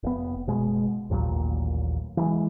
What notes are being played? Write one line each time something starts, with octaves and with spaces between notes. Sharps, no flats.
F1 B3
F#1 B2 G#3
A1 D#2 A#2 F#3
E3 F#3 G#3